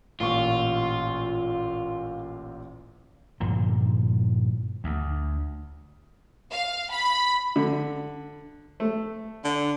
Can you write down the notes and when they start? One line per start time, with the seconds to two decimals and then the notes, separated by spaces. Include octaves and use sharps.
0.20 A1 A#2 F4 C#6
3.40 G2 A#2 D3 F3
4.84 D2
6.51 F5
6.91 B5
7.56 D3
8.80 A3
9.44 D3